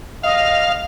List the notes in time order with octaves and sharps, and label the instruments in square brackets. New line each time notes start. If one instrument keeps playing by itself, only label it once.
[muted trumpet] D#5 [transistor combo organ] F5